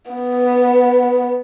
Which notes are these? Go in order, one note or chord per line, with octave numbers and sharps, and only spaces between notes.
B3